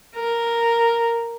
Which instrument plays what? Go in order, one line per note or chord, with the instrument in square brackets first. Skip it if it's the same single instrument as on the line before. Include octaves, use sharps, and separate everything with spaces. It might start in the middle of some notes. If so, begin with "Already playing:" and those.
[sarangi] A#4